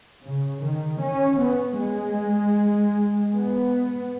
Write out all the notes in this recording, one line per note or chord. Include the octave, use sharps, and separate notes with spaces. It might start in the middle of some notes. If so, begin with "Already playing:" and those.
C#3
D#3
C#4
B3
G#3
B3